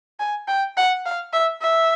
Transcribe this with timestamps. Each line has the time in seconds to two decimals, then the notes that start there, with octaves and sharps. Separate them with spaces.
0.20 G#5
0.48 G5
0.77 F#5
1.05 F5
1.33 E5
1.61 E5